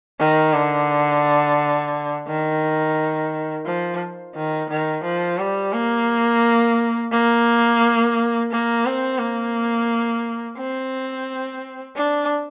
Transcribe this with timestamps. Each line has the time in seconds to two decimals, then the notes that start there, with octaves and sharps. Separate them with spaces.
0.20 D#3
0.53 D3
2.27 D#3
3.66 F3
4.35 D#3
4.70 D#3
5.04 F3
5.39 G3
5.73 A#3
7.12 A#3
8.51 A#3
8.85 C4
9.19 A#3
10.58 C4
11.96 D4